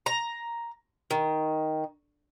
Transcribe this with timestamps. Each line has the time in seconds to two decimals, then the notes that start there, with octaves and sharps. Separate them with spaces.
0.06 A#5
1.11 D#3